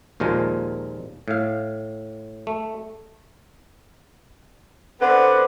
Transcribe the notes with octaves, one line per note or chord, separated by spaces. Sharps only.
D#2 A#2 F3 G#3 F4 A#5
A2 F5
A3
D3 B3 C4 B4 D5 F#5